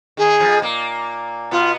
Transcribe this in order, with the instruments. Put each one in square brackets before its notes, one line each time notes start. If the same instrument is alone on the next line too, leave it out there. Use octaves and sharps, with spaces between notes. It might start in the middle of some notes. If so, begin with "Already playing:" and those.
[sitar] D#3 [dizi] G#4
[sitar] F2 F3
A#2 A#3
[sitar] B2 B3 [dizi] F4